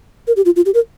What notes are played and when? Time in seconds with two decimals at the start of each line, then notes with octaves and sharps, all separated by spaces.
0.27 A#4
0.37 G4
0.45 F4
0.56 F4
0.66 G4
0.74 A#4